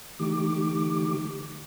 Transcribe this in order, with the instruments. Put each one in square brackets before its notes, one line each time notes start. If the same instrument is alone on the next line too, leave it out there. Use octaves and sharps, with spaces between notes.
[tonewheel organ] D3 E3 A3 D#4 G4 D6